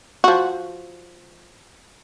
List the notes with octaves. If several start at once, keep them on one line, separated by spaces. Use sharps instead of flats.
F3 F#4